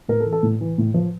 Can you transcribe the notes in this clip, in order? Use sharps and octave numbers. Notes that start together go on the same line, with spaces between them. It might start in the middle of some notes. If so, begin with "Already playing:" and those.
A2 A#4
A4
E3
A4
A2
E3
A2
F3